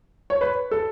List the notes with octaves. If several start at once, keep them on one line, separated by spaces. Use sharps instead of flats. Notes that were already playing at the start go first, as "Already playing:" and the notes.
C#5
B4
A4